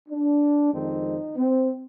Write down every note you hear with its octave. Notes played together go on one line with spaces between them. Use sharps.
D4
F2 D#3 G#3 C4 D#4
C4